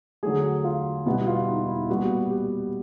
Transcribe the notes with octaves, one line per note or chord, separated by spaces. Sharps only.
D3 F#3 A3 G#4
F4
B2 G3 B3 E4
F4
D#4
E4
A#2 G3 B3 F#4
G4